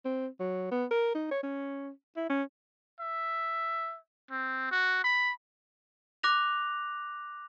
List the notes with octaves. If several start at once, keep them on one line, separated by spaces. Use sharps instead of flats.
C4
F#3
B3
A#4
D#4
C#5
C#4
E4
C#4
E5
C4
F#4
B5
D6 F#6 A#6 F7